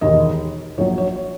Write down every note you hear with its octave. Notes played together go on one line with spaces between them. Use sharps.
E1 D#2 D#3 D#5
A#1 A#2 F#3 C#5
C#5
C#5